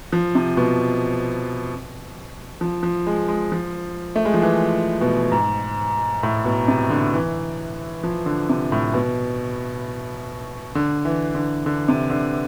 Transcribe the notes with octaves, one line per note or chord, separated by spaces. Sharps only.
F3
C3
B2
F3
F3
G#3
G#3
F3
A3
G#3
F3
E3
B2
G#2
A2
B2
C3
D3
E3
F3
D3
C3
A2
B2
D3
E3
D3
D3
C3
D3